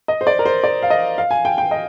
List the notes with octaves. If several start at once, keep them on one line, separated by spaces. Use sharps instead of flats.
D#5
C5
D5
A#4
C5
D5
F5
D#5
F5
G#5
G5
G5
D#5